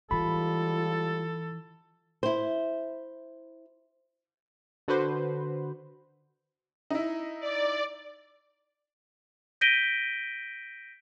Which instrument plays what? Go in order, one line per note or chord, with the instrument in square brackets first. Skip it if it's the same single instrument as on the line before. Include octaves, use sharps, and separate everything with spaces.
[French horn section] G#2 G3 F4 [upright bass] E3 [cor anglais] A4 [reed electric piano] B5
[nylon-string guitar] E4 C5
[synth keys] D3 F#4 B4 C5
[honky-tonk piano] D#4 E4
[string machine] D5
[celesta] G6 A#6 B6 D7 D#7 G7